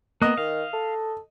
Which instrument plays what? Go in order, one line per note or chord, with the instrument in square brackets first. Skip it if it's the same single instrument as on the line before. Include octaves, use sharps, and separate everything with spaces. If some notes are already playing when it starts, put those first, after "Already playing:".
[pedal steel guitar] A#3 B3 [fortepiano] D#5 F#6
[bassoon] D#3 [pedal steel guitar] F5
[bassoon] A4